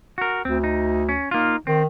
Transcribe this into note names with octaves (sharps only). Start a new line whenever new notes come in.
F#4 A#4
D2 C4
D#4
C#4
A#3 D#4 F4
D#3 C4